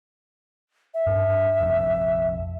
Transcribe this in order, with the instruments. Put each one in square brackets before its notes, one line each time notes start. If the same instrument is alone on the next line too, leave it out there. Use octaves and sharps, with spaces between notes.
[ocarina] E5
[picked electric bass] G2 G3 D4
F1 A#1 F2